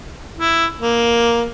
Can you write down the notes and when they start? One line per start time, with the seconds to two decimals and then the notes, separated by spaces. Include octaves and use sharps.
0.36 E4
0.80 A#3